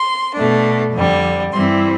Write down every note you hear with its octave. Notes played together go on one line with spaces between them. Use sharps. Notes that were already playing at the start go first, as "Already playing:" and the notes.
Already playing: C6
B2 A3 D4
F2 D3 G3
G2 E3 G3 C4 E4 C6